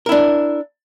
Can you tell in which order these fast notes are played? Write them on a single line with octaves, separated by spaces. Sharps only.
A#4 E4 D4